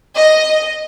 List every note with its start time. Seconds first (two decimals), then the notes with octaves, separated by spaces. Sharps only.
0.15 D#5